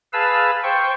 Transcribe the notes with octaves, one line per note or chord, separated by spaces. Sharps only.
G#4 B4 F5 A5 E6
C5 G5 C#6